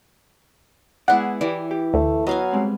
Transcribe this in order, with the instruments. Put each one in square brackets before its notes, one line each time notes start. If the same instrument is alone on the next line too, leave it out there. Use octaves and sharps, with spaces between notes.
[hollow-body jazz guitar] G#3 B3 D5 [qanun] E4 G#4 [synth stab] F#5
[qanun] E3 [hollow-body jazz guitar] G4 D5
[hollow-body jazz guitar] G4
[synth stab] D2 [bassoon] A3
[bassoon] F#3 [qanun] B3 F5 G#5 [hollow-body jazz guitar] D#5
[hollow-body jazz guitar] G3 G#3 C4